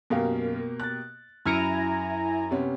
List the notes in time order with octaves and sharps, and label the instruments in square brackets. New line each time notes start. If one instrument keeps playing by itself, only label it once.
[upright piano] F#2 F5 [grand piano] B2 A#3 G4
[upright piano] F#6 A6
[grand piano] F#2 [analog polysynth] E4 G#5 A#5 [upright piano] F6 C#7 D7
[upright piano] C3 B3 C#4